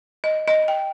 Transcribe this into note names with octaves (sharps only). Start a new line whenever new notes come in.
D#5
D#5
G5